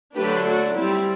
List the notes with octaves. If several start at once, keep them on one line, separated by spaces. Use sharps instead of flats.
D3 F#3 A3 D4 G4 B4
F#4 A4
G3 C4 E4 G4